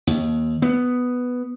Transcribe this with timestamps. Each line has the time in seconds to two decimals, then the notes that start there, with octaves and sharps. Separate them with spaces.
0.07 D#2
0.62 B3